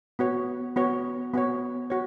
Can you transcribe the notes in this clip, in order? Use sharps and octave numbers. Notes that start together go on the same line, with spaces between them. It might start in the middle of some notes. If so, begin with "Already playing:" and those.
B3 F#4 C#5
B3 F#4 C#5
B3 F#4 C#5
F#4 C#5